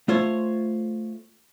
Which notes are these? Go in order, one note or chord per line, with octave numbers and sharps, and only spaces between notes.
A3 F4 C5 C#5